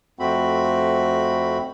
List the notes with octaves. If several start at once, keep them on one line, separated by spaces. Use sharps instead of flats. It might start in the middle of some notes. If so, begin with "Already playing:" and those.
F2 A3 C4 F#4 B5